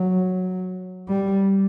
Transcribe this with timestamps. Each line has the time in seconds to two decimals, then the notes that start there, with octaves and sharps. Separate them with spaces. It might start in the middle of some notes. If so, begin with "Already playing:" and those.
Already playing: F#3
1.08 G3